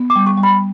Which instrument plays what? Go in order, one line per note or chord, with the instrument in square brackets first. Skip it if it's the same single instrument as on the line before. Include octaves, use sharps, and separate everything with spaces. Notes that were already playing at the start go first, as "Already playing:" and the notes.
Already playing: [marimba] B3
[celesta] D6
[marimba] G3
[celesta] C#6
[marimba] G3
[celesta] B5